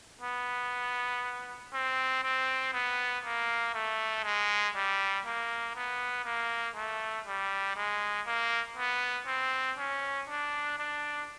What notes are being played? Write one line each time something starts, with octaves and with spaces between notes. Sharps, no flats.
B3
C4
C4
B3
A#3
A3
G#3
G3
A#3
B3
A#3
A3
G3
G#3
A#3
B3
C4
C#4
D4
D4